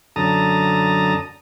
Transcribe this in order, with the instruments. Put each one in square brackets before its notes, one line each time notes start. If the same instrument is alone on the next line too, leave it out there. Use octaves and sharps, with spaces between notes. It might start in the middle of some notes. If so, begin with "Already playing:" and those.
[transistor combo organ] F#2 D3 A5 A#5 D#6